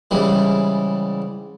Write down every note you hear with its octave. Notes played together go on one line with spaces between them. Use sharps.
G#2 C#3 E3 G3